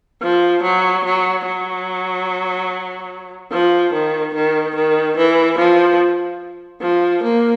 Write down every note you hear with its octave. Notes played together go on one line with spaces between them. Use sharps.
F3
F#3
F#3
F#3
F3
D#3
D#3
D#3
E3
F3
F3
A#3